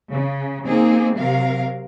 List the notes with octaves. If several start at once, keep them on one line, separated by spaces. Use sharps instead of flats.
C#3
A#3 C4 D#4 G#4
C3 F#3 A#4 F5